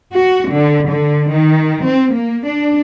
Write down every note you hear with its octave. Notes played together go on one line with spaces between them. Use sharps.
F#4
D3
D3
D#3
C4
A#3
D4